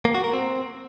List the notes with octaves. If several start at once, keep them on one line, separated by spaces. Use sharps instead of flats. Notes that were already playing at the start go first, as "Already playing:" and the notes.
A#3
F#4
A#4
C4